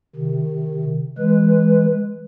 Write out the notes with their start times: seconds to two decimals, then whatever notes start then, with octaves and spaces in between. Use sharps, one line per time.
0.16 C3 D#3
1.18 E3 G#3 B4